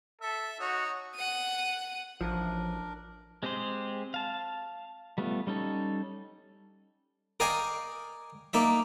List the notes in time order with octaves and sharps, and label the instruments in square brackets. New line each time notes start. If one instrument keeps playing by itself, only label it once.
[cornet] A4 [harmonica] E5
[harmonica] D#4 C#5 [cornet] F#4
[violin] F#5 D#7
[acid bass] A1 [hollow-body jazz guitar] F3 [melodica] D4 A#4
[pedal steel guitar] G#3 C4 G4 G#4 C5
F5 A5
G3 A3 B3 F4
G3 C#4 D#4 A4
[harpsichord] A#4 D5 D#5 F5 G5 G#5
A#3 D#4 D5 E5